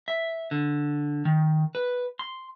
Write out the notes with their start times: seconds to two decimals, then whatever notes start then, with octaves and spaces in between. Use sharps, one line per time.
0.08 E5
0.51 D3
1.25 D#3
1.75 B4
2.19 C6